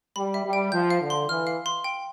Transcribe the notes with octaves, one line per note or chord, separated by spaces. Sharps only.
G3 B5
E5
G3
G5
F3 G6
F5
D3
C6
E3 F6
F5
C6
G5